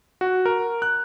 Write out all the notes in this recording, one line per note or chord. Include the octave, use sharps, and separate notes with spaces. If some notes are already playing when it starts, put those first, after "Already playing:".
F#4
A#4
F#6